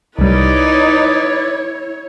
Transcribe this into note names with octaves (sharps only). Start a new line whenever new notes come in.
C2 G3 D#4 E4 B4 C#5 D5